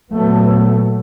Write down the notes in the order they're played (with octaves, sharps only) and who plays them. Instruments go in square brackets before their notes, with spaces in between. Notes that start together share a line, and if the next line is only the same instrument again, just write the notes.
[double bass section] A#2 F#3 A3 B3